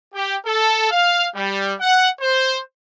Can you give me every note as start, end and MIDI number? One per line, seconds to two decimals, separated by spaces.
0.14 0.36 67
0.46 0.90 69
0.91 1.27 77
1.35 1.73 55
1.80 2.08 78
2.21 2.59 72